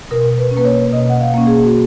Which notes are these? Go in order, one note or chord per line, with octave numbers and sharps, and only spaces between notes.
B2 A#4
B4
C#4
A#3 B4
C#5
B2 D#5
F#5
F5
A#3 C#4
G#4
F#4